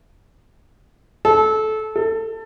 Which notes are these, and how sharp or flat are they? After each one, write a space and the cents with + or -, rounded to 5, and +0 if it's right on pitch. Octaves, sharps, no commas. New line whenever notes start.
A4 -20
A4 +25